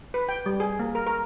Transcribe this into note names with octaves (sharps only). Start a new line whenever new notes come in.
B4
G5
G3
G#4
A#3
A#4
A#4